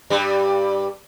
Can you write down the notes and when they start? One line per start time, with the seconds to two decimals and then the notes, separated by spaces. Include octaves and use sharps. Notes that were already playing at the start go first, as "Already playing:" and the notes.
0.10 G2 G3